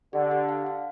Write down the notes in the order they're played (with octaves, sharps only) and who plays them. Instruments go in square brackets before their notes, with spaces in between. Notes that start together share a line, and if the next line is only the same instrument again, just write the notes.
[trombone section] D3 [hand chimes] G4
[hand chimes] G4
F5
F5